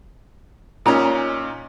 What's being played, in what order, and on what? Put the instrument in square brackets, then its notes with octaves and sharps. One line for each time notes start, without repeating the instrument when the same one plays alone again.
[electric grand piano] A#2 C#4 [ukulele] D#4 A#5